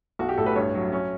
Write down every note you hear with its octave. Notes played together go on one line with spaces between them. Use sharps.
B1 F#4
G4
A2 A4
B4
G2 C#5
F#3
C#4